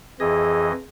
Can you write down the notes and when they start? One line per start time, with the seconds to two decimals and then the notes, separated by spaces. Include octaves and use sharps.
0.20 F2 E3 G#4 D#5